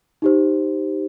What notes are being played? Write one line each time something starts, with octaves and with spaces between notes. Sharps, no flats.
D#4 G4 C5